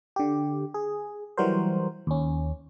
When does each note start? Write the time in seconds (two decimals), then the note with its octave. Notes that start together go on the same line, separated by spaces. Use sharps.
0.16 D3 G4
0.74 G#4
1.37 E3 F#3 G3 F#4 A#4 C5
2.07 D#2 C#4